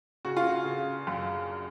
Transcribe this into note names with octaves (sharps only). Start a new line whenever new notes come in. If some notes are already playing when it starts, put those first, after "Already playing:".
C#3 F#4
F4
F#4
C#3
F#2